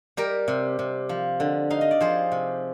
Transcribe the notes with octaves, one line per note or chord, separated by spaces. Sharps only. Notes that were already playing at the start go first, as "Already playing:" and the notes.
G3 G4 A#4
C3
C3
F3
D3
D#4 F5
D#5
D5
F3 G#4 C5
C3